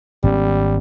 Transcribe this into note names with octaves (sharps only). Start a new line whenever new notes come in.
G#1 G3 B3 C#4